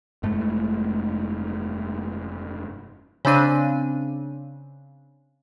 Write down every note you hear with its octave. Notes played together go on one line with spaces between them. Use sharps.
F1 G2 G#3 A3
C#3 C4 D4 D#7